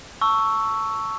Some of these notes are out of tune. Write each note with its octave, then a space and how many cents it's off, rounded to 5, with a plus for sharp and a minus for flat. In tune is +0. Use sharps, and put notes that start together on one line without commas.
A5 +15 C#6 +5 E6 +0